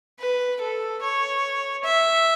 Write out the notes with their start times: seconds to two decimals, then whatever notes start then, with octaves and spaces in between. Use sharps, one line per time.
0.19 B4
0.61 A4
1.02 C#5
1.84 E5